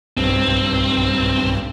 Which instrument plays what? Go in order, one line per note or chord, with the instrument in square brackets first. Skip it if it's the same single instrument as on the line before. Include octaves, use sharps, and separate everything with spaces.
[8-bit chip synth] B1 G2 [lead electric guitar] C4